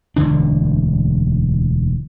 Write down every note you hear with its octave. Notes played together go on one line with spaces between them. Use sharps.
E1 D2 D3 D4